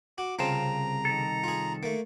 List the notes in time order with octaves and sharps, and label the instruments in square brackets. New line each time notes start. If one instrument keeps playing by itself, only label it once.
[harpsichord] F#4 [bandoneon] D6
[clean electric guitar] C2 F5 A5 [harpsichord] C#3 C4 F4 [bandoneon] A#5
[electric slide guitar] D#3 A4
[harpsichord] F4 G#4
A3 A#3